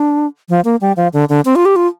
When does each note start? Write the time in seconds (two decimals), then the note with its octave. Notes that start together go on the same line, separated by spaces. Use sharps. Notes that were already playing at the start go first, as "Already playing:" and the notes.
Already playing: D4
0.49 F3
0.65 A#3
0.81 G3
0.97 F3
1.13 D3
1.29 D3
1.45 C4
1.56 F4
1.65 G4
1.76 F4